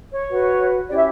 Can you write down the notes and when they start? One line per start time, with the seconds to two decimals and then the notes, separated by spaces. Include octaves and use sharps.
0.11 C#5
0.30 F#4 B4
0.88 C#4 E4 G4 C#5 D5
0.96 E5